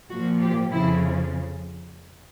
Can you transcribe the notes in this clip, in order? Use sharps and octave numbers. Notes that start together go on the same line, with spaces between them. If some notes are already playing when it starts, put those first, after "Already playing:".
A#2 F3 F#4
G4
F2 C#3 F3 E4